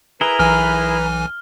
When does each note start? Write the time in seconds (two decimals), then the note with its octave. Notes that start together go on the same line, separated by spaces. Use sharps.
0.21 E4 G#4 A#4 B4 A#5 G7
0.39 B1 E3 G#5 F6